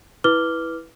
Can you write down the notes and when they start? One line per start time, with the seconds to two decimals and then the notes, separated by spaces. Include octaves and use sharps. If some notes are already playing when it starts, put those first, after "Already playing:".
0.24 E4 B4 D6 F6 G7